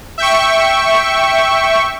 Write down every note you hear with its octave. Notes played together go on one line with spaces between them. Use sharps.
E5 G5 C#6